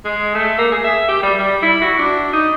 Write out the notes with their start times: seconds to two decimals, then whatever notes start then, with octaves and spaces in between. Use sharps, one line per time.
0.05 G#3
0.35 A3
0.58 A#3
0.72 G#4
0.84 E5
1.08 G4
1.23 G3
1.39 G3
1.62 E4
1.81 F#4
1.98 D4
2.33 D#4